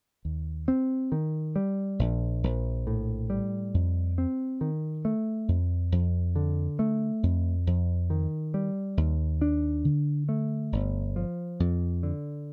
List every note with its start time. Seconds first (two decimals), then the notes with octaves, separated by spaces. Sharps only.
0.25 D#2
0.68 C4
1.12 D#3
1.56 G3
1.99 A#1
2.43 A#1
2.87 A2
3.30 G3
3.74 F2
4.18 C4
4.61 D#3
5.05 A3
5.48 F2
5.92 F2
6.36 D3
6.79 A3
7.23 F2
7.67 F2
8.10 D#3
8.54 G3
8.97 D#2
9.42 D4
9.85 D3
10.29 A3
10.72 G1
11.16 F3
11.60 F2
12.03 D3